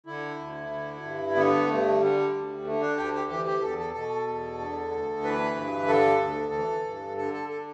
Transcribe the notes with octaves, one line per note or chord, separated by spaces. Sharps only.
D3 E4
D2
D3
G2
D3 B3
G2 A3
D3 G3
D2
D3 A3
D4
D2 G4
G4
E3 G4
G4
E2 A4
A4
B2 A4
E2
D3
D2
E3 B4
G2
D3 A4
D2
E3
G2
D3 A4
A4
A4